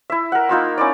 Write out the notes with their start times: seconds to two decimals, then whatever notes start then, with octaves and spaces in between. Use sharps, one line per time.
0.10 E4 E5
0.32 A#4 F#5
0.49 A#3 D#4 F4 E6
0.78 C#4 E4 D5